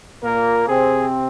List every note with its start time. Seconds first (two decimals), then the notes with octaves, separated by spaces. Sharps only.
0.23 A#2 A#3 A#4
0.68 C3 C4 G#4